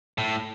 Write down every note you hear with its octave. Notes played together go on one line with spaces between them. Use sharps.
A2